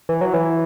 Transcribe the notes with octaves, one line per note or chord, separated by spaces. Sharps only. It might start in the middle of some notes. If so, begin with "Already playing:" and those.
E3
F#3
E3